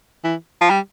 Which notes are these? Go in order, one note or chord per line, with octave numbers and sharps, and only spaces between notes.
E3
F3
G3